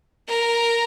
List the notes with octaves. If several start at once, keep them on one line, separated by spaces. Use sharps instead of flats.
A#4